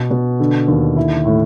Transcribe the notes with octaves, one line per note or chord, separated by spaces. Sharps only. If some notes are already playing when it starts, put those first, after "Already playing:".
Already playing: B2 B3
B2
D3
D#2
E4
A2